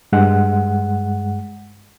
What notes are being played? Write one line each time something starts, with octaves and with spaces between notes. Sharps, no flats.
G2 G#3 F#5